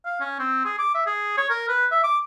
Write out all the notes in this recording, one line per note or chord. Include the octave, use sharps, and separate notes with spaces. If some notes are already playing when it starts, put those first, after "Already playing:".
F5
C#4
C4
G#4
D6
E5
G#4
C#5
A#4
B4
E5
D6